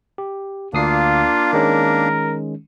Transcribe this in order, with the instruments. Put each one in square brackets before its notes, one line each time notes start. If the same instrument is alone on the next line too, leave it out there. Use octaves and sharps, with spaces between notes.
[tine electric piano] G4
[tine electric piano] D2 D#6 C7 [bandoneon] A#3 D4 [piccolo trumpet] F4
[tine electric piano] D#3 G#3 C#4 [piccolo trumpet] A#4